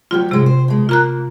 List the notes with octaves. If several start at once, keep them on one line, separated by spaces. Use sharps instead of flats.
D2 F#3 F4 G4
G#2 C3 G#3
C5
B2 G#3
A#3 F4 A#5 F#6